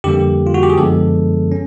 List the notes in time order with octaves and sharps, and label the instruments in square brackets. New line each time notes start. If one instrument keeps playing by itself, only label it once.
[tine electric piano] F2 D3 G3 A#3 G4
F4
F#4
G4
G#4
F#2 D3 F3 G#3 B3 A4
C#4